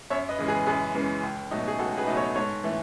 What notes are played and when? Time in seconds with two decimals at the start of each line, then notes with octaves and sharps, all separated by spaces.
0.10 F#2 C#5 E5
0.29 B4 D#5
0.39 C#3 E3 G#3
0.48 G#4 B4
0.67 F#2 G#4 B4
0.95 C#3 E3 G#3
1.23 C#2
1.51 B2 F#3 A3 D#4
1.68 G#4
1.79 C#2 F#4 A4
1.97 G#4 B4
2.07 B2 F#3 A3 D#4
2.17 A4 C#5
2.35 G#2 A4 C#5
2.64 E3 A3